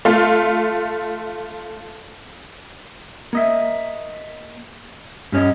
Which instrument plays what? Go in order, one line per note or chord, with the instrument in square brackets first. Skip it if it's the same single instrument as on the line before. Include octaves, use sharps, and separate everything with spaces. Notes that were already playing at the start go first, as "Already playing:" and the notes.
[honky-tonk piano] A3 F4
[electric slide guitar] A#3 D#5 E5
G2 C#4 C#5 D#5